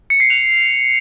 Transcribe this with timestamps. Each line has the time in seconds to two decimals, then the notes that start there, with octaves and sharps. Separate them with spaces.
0.10 C#7
0.20 C7
0.30 F7